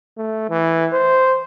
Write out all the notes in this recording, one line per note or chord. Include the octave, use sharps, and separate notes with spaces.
A3
E3
C5